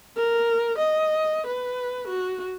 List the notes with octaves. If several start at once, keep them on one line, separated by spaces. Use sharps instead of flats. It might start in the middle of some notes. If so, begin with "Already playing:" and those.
A#4
D#5
B4
F#4